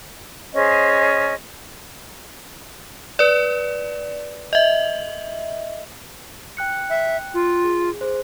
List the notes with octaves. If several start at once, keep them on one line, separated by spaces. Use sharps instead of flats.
C#4 G#4 C5 D#5
B4 D5
D#5 E5
G5 F#6 C#7
E5
F4
G#4
G#4 C5